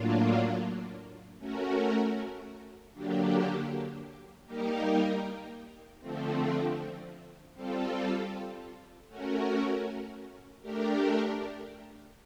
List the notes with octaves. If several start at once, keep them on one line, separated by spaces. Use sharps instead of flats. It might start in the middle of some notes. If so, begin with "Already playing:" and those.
Already playing: A2 F#3 A#3 D4 F4
A3 C#4 F#4 A#4
D3 F#3 A#3 D4 G4
G3 A#3 D#4 G4 A#4
D3 F3 A3 C4
G3 C4 F4 A4
A3 C#4 F#4 A#4
A3 D4 G4 A#4